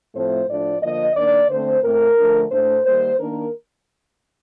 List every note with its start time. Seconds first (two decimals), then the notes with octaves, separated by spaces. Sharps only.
0.14 A2 F3 A3 C4 C5
0.48 A2 F3 A3 D4 D5
0.82 D3 F3 A#3 D#5
1.15 D#3 A#3 D4 D5
1.50 D3 A3 C4 C5
1.83 A2 A3 C4 A#4
2.18 D3 F3 A3 D4
2.51 A2 A3 D4 C5
2.85 D#3 G3 A#3 C5
3.19 D#3 A#3 D4 A#4